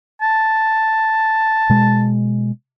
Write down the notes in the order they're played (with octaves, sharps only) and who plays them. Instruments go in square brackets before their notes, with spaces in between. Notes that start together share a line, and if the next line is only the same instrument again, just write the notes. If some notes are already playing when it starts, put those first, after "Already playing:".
[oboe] A5
[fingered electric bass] B2 G#3